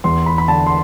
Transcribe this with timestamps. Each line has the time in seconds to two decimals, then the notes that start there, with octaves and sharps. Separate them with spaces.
0.04 E2 C6
0.26 B5
0.38 B5
0.48 D3 A5
0.66 C6